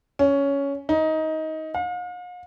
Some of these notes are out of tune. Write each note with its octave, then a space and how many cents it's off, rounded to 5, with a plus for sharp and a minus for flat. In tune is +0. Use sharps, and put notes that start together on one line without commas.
C#4 +10
D#4 +20
F5 +45